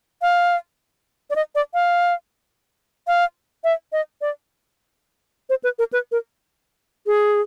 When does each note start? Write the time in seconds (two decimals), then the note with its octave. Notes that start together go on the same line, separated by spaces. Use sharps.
0.22 F5
1.30 D5
1.36 D#5
1.55 D5
1.74 F5
3.07 F5
3.64 E5
3.92 D#5
4.21 D5
5.50 C5
5.64 B4
5.79 A#4
5.93 B4
6.12 A#4
7.07 G#4